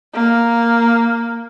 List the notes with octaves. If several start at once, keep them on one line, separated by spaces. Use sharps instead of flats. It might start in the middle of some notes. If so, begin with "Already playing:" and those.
A#3